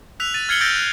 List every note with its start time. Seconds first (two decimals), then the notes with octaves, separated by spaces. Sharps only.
0.20 E6 F#6 B6 F7
0.34 A6 D#7
0.49 F6 G#6 C7 C#7 F#7 G7
0.61 E6 F#6 G6 A6 A#6 D7
0.76 F#6